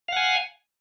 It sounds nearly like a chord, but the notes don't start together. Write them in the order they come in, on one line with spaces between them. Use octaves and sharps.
F5 F#5 G#5